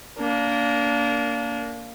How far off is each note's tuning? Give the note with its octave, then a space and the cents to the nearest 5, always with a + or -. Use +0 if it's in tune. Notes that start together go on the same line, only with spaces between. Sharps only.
A#3 +0 D4 -25